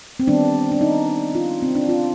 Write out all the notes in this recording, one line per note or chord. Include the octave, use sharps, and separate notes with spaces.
C4
D#3 G3 B3 D4
D4
D#4
F4
C4
D4
F4